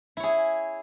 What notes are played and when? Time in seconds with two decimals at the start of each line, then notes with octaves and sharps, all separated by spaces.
0.17 E4
0.20 C#5
0.23 G#4